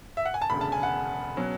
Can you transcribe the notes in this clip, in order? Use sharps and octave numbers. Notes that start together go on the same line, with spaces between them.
E5
F#5
G#5
A5
E1 D2 C#3 B5
A5
G#5
F#5
B2 F#3 C#4